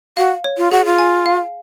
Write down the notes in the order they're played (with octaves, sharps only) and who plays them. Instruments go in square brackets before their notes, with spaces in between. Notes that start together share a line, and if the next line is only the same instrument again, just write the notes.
[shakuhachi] F#4 [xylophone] F5
[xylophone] C#5
[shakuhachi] F4
[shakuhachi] F#4 [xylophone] G#4
[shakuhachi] F4
[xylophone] G#5
F5